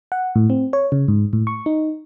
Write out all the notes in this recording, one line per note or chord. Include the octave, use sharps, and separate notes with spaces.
F#5
A2
C4
C#5
C#3
G#2
A2
C#6
D#4